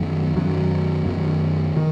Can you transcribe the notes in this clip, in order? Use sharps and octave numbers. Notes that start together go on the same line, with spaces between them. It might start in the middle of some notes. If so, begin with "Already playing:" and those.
Already playing: F#2 D#3 F#3
F#2 D#3 F#3
F#2 D#3 F#3
D#3